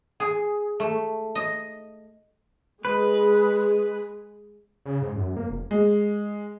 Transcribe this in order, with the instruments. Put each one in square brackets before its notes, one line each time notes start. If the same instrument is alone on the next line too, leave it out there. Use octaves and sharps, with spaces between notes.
[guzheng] G#4
A3
D#5
[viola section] G#3 G#4 [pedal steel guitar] B4
[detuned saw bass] C#3
G#2
F#2
A#3
F1
[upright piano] G#3